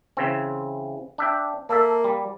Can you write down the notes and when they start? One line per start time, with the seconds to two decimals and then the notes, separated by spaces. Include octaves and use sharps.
0.17 C#3 E3 C4
1.18 D4 E5 G5
1.69 A#3 A4 E5
2.04 G3